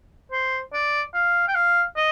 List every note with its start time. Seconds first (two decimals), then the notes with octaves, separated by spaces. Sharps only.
0.32 C5
0.73 D5
1.14 F5
1.48 G5
1.55 F5
1.97 D#5